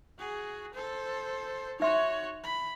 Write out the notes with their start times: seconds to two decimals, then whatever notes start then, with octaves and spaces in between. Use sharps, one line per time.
0.18 F#4 G#4
0.74 A4 C5
1.80 D#4 F#4 C#5 E5 C6
2.44 B5